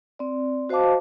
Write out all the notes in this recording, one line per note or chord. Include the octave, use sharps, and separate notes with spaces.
C4 D5
F#4 C5 D#5 F5 A5 D6